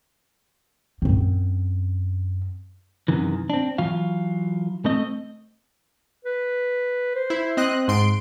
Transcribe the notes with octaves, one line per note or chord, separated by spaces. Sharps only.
F#2 C4
F#2 C3 D#3 E3
C4 D4
E3 F#3 F4 F5
A3 C4 D#5
B4
C5
E4
C4 D#5 F#6
G#2 C6 D7